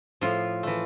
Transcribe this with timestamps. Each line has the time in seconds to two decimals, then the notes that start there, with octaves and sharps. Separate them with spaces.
0.21 A2 F3 F4
0.63 E3 A3